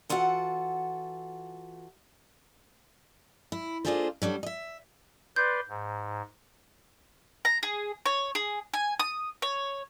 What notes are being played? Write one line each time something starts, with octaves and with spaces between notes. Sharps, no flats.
E3 F4 F#4 A4 F#5
E4
A#3 D4 F4 G#4 A4 C5
F#3 G3 D4 A4
D#5 E5
B4 D5 C6 G6
G#2
A#5
G#4
C#5
G#4
G#5
D#6
C#5